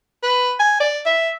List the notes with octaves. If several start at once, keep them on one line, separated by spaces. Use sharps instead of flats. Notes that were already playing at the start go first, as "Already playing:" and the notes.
B4
G#5
D5
E5